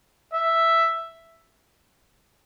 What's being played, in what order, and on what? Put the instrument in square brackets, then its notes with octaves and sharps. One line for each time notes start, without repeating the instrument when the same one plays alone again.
[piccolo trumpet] E5